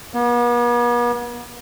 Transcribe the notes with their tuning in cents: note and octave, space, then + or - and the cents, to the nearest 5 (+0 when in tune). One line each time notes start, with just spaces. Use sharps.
B3 -45